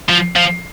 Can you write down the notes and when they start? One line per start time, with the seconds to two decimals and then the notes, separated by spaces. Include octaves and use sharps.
0.09 F3
0.36 F3